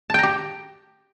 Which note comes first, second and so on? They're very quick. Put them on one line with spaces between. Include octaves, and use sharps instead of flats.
A5 G5 A#5 G4